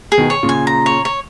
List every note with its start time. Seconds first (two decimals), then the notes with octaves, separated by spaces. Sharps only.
0.12 G#4
0.18 B2 D#3
0.30 C#5
0.43 A#2 C#3
0.49 G#5
0.67 A#5
0.86 C#5
1.05 C#5